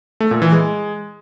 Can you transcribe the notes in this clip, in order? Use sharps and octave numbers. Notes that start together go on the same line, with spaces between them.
A3
A#2
E3
G#3